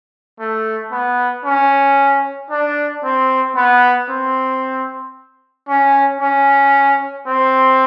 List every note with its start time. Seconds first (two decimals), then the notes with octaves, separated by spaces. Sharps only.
0.39 A3
0.92 B3
1.45 C#4
2.51 D4
3.04 C4
3.56 B3
4.09 C4
5.68 C#4
6.21 C#4
7.27 C4